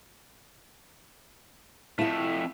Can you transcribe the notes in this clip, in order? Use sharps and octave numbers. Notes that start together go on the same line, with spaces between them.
F2 A3 E4 E5